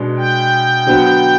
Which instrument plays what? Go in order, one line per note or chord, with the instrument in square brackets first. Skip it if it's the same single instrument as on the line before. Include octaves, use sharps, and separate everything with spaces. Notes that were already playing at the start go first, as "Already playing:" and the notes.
Already playing: [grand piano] B2 G#3 B3 D4
[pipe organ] G5
[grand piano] D3 F#3 B3